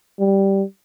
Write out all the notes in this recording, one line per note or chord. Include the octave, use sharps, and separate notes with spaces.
G3